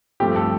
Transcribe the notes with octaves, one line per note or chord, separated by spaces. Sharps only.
G2 F3 A3 C4 G4
A4